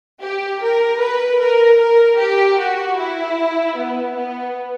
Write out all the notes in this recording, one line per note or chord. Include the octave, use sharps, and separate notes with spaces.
G4
A#4
B4
A#4
A#4
G4
F#4
E4
B3
B3